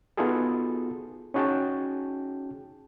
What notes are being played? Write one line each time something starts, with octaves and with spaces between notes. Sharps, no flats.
B3 D#4 F4 F#4 G#4 A4
C#4 D#4 F#4 G#4 G5 A5